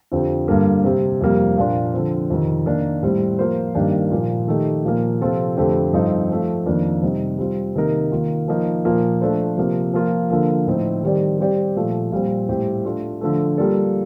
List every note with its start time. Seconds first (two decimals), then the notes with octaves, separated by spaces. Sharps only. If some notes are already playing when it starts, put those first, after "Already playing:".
0.12 F2 D3 F3 C4 G4
0.48 G2 D3 G3 A#3
0.84 C3 G3 C4
1.21 F2 C3 G3 A#3
1.57 A#2 F3 A#3 D4 F4
1.94 D3 F3 C4
2.30 F2 C3 D#3
2.66 D#3 A#3 D4
3.03 A2 G3 C4
3.39 F3 A#3 F4 C5
3.75 G2 D#3 A#3 D4 G4
4.11 A#2 F3 A#3
4.48 D#3 A3 D#4 G4
4.85 A#2 F3 A#3
5.21 C3 F3 C4 F4 A4
5.57 F2 D3 A3 C4 G4
5.93 G2 F3 C4 D#4 A4
6.30 F3 A3 C4
6.66 F2 D#3 A#3 D4
7.03 C3 G3 C4 D#4
7.39 G3 C4 F4
7.76 C3 D#3 A#3 D#4 A#4
8.12 D#3 A#3 F4
8.48 F3 A#3 D#4
8.85 A#2 F3 A#3 F4
9.21 F3 A3 D4 A4 C5
9.58 C3 F3 A#3
9.93 F3 A#3 F4
10.30 D3 F3 A#3
10.67 A2 F3 C4 D#4
11.03 D#3 G3 C4 G4 D5
11.39 G3 C4 G4 D5
11.76 A#2 F3 A3
12.12 A#2 G3 C4
12.48 A2 G3 C4 G4
12.85 A3 D4 F4
13.21 D3 F3 A3
13.58 G3 A#3 F4 A4 D5